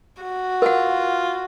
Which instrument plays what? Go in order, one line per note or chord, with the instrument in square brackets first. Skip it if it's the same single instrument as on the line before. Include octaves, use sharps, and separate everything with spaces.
[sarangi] F#4
[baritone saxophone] F4 [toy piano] A#4 F#5